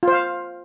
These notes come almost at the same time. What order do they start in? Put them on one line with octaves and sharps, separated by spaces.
F4 C5 F5